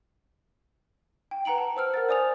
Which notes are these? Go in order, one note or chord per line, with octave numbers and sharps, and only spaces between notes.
G5
B4 F#5 A#5 D7 F#7
A5
C5 E6 F6
A#4 F#5 A6
C5 D5 G#5 D#6 A6 F7